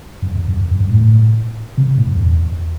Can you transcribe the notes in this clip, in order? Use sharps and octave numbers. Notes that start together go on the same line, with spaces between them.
F#2
E2
F#2
E2
F#2
G2
A2
C3
A2
F#2
E2